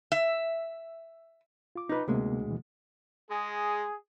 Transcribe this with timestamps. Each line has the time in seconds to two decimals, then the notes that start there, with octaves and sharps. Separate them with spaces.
0.12 E5
1.76 F4 D6
1.89 D#4 B4
2.08 D2 C3 G#3 A#3 B3
2.47 B2 E3
3.31 G#3 G#4